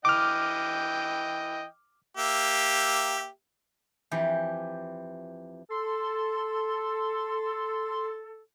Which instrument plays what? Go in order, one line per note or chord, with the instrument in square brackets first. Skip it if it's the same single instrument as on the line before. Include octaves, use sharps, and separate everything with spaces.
[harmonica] E3 D#5 G5 [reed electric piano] D6 F6
[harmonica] A#3 G4 E5
[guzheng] F2 E3 G4
[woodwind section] A4 [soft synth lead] C6